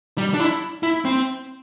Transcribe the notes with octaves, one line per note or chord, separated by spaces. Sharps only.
G3
D4
E4
E4
C4